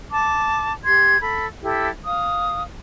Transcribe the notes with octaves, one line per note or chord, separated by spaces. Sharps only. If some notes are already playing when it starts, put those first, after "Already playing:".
A5 D6
G4 C6 G#6
A4 B5
E4 G4 A4
F5 D#6